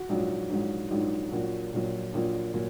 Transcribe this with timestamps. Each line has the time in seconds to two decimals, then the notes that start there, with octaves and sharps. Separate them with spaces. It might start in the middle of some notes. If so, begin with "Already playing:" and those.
Already playing: F#4
0.09 A#1 G#2 F#3
0.50 A#1 G#2 F#3
0.91 A#1 G#2 F#3 D#4
1.32 A#1 A#2 F#3 F#4
1.73 A#1 A#2 F#3
2.14 A#1 A#2 F#3
2.54 A#2 F#3